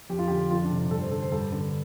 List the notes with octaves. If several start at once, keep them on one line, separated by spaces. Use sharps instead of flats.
F2 G4
F4
D3 G4
F2 F4
D4
C3
G2 A4
C5
D3 A4
C5
G2 A4
D3